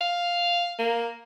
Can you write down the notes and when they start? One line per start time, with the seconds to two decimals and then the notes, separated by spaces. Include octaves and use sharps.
0.01 F5
0.79 A#3